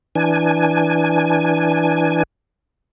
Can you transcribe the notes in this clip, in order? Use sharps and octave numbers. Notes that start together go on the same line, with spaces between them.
E3 D4 G#5